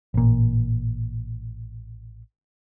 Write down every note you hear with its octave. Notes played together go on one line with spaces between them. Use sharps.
A1 A#2